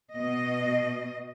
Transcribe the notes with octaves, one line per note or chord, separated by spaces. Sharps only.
B2 D#5